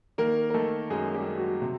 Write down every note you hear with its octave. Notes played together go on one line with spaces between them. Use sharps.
D#3 A#3 A#4
A#4
D#3 A3 A4
F#2 G#3 G#4
G3 G4
F#2
F#3 F#4
C3